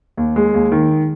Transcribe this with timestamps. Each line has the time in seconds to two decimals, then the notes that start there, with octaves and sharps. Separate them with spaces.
0.17 D#2
0.36 G#3
0.54 D#2
0.72 D#3